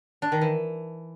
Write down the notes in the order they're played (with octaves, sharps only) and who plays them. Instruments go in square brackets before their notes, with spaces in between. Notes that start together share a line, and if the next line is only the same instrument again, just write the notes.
[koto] D4
D#3
E3